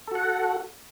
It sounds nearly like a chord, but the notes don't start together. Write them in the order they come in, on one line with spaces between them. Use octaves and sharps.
A4 F#4 F#5